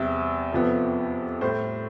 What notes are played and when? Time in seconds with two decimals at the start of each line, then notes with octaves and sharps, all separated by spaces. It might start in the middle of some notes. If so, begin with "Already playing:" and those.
Already playing: E2 C3 G3 E5
0.52 F2 C3 F3 B3
1.41 A2 G3 C5